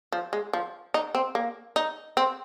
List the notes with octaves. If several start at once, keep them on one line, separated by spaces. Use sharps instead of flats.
F3
G#3
F3
D#4
C4
A#3
D#4
C4